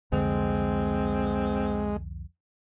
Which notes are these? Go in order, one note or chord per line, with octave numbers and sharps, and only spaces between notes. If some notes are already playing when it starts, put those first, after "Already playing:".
C2 F2 D3 G#3 C4